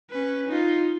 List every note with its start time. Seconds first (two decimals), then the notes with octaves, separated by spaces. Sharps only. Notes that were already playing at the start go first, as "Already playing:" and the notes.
0.10 C#4 B4
0.48 D#4 F4